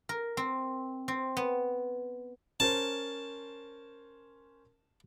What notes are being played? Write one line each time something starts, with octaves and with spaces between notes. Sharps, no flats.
A#4
C4
C4
B3
C#4 A#4 C5 A5